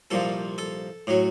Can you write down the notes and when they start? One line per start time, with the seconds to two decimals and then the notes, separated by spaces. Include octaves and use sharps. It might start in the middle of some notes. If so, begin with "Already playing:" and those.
0.11 C2 A#2 F3 A4
0.58 A4
1.07 A2 F#3